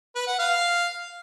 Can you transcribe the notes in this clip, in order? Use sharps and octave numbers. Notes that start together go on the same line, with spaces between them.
B4
F#5
F5